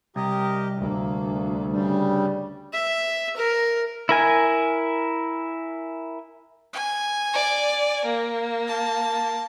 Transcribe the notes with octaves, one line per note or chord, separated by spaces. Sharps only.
C2 G4 A#4 D#5
D2 A#3
G2 C#3 G3
E5
A#4
E4 A#4 G#5
G#5
D5
A#3
A5